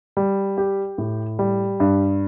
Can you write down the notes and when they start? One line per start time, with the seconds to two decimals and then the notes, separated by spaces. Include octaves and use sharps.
0.17 G3
0.57 G4
0.98 A2
1.39 G3
1.80 G2